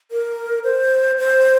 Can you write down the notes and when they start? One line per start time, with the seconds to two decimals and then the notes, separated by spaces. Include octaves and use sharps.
0.11 A#4
0.64 C5
1.18 C5